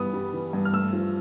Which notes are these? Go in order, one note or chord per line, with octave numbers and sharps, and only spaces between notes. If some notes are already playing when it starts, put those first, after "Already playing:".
Already playing: G2 E3 G3 B3 D#6
G3
E3
G2
F6
A3 E6
F3